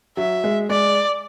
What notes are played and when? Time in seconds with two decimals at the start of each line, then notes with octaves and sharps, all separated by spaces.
0.17 F#3 E5
0.44 G#3
0.69 G#3 D5